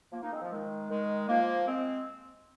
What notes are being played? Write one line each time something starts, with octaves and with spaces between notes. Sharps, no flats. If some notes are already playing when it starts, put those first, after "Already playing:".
F3 A#3
A#3 D#4
G#3 C4
F3
D#3 G#3
D#3 G#3
F3 A#3
G#3 C4